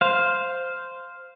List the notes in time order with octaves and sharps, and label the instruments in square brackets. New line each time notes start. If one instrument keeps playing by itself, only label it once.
[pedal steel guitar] C5 F5